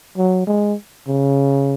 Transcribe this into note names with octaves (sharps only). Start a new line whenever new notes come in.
F#3
G#3
C#3